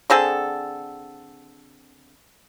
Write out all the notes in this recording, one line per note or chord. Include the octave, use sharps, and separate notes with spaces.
D3 C4 G#4 A4